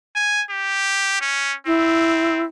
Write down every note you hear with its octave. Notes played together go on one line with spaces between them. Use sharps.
G#5
G4
C#4
C4 E4